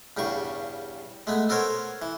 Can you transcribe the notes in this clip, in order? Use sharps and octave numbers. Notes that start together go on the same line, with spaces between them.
E2 G2 C#3 C#6
G#3 A3 B3
B3 A4 A#4 C5 C#5
E3